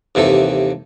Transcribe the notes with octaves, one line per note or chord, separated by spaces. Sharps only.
D#2 C3 E3 A4